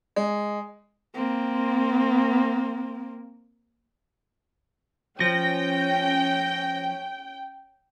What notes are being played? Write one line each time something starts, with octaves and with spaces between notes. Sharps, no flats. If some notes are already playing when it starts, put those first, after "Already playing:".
G#3
A#3 C4
F3 C#4 G5 A#6